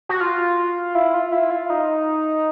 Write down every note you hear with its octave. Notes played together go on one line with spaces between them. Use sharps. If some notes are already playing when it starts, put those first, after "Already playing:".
F#4
F4
E4
F4
E4
F4
D#4